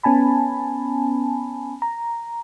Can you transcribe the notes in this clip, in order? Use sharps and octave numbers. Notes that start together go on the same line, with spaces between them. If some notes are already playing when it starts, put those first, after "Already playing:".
B3 C#4 G#5 A5 B5
A#5